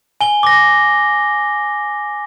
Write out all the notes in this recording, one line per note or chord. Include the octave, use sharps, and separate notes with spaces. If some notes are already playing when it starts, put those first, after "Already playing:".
G#5 G7
D6 A#6